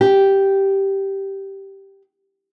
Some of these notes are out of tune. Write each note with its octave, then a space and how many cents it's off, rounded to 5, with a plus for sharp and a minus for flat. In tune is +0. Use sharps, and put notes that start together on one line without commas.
G4 -5